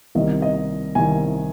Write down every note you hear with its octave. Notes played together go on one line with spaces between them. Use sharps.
C2 C3 D#3 D#5
D#5
C2 C3 D#3 G#5